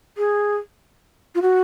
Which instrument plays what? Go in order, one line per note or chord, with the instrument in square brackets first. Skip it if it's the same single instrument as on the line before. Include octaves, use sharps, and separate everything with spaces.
[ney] G#4
F4
F#4